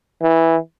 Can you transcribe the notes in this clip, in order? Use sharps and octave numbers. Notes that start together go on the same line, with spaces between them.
E3